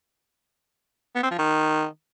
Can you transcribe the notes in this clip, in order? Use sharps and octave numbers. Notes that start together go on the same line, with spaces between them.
B3
C4
F3
D#3